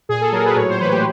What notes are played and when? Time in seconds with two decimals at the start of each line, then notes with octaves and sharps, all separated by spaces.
0.09 A#2 G#4
0.21 A4
0.32 F#3 A#4
0.45 B4
0.56 A2 C#5
0.69 C5
0.80 E3 B4
0.92 G4